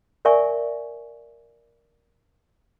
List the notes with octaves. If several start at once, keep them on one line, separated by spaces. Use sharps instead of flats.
A#4 D5 E5 G#5 C#6